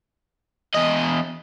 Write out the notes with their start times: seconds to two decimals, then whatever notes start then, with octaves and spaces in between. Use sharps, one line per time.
0.75 E2 D#5